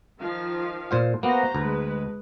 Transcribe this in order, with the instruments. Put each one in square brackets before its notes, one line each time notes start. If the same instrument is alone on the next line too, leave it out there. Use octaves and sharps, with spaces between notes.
[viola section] D#3 F3 F5
[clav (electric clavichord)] A#2 C5 F5
[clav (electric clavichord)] A#3 B3 [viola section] F#4 C5 A#5
[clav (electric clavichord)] D2 [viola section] G#3 B4